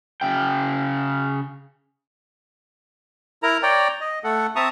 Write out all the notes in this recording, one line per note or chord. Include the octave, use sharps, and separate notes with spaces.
C#3 G5
E4 A#4 A#5
C#5 D5 G5 A#5
D#5
A3 A4 F#5
C4 E5 A5 A#5 C#6 D#6